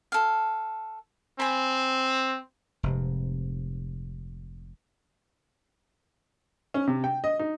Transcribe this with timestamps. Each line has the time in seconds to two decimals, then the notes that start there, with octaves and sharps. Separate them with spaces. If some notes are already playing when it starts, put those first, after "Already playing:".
0.12 A4 F5
1.40 C4 G#5 B5
2.83 F1 G#2 C3
6.74 C#4
6.87 C3
7.04 G5
7.24 D#5
7.39 D#4